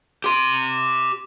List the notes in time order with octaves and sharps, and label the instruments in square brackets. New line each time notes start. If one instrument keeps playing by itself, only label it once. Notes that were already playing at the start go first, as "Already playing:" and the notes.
[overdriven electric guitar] G4 C6